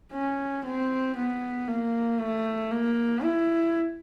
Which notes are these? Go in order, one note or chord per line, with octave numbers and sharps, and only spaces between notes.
C#4
C4
B3
A#3
A3
A#3
E4